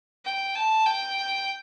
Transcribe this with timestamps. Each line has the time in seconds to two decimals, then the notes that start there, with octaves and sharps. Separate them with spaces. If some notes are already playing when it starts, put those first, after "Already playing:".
0.25 G5
0.55 A5
0.86 G5